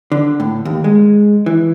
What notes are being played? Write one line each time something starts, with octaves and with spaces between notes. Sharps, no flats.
D3
A2
D#2
G#3
E3